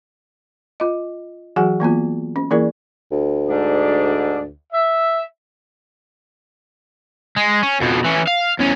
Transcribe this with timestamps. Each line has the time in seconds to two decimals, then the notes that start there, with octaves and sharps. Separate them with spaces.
0.80 F4 D#5
1.56 E3 F#3 F#4 G#4 F#5 G#5
1.80 E3 A#3 B3 F4
2.36 C#4
2.51 E3 A#3 E4 G#4 A#4 D5
3.12 D2
3.48 G#2 D4 D5
4.73 E5
7.36 G#3
7.63 C#4
7.81 F2 B2
8.05 E3 C#4
8.28 F5
8.59 E2 C#4